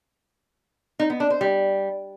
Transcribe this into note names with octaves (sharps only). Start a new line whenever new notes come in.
D#4
B3
D4
C5
G3